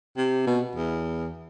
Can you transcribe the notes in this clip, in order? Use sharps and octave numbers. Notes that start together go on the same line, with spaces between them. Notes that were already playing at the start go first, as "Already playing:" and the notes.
C3
B2
E2